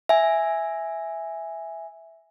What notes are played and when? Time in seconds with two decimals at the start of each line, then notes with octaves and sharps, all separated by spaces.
0.09 E5 G#5